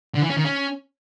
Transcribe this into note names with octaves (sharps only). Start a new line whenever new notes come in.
D3
E3
C#4
D#3
C#4